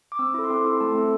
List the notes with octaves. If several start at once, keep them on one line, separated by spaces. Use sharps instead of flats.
D6
C4 E6
E4 A4 D6
C6
C4 D6
E4 A4 C6
A3 A5
C4 A4